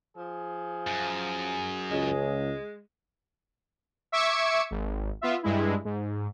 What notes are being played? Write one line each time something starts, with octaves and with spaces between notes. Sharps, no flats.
F3 G#4
F#2
C#2 G#3
E5 C#6 D6 E6 G#6 C#7
G#1
B3 F4 E5
G2 G#3 E4
G#2